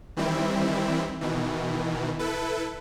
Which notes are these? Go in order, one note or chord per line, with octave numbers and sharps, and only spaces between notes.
D#3 E3 G3 C4 E4
B2 D#3 E3
E4 A4 B4